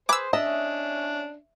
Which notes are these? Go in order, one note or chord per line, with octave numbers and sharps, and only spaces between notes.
G#4 B4 C5 D6 E6
C#4 D4 D#5 E5 A5